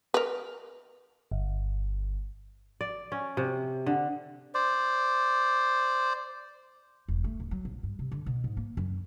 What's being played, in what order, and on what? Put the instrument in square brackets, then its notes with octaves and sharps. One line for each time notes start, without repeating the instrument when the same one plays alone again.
[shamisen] A#4 B4
[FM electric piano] G1
[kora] D5
C#4
C3
D3
[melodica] C5 D5
[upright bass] E1
A3
D1
F#3
A#1
G2
C3
D3
B2
G#2
A#3
F#2